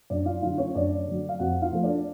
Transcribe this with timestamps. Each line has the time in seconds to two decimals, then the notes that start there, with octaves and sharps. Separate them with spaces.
0.10 F#2 D4 D5
0.26 F4 F5
0.42 D3 F#3 F4 F5
0.58 C#4 C#5
0.75 F#2 D4 D5
1.07 D3 F#3
1.29 F5
1.39 F2 F#4 F#5
1.62 F4 F5
1.72 F3 A3
1.83 D4 D5